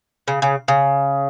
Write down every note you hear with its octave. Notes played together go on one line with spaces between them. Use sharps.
C#3
C#3
C#3